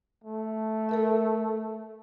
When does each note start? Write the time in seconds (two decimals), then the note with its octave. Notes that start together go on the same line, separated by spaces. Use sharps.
0.24 A3
0.89 A4 A#4 E5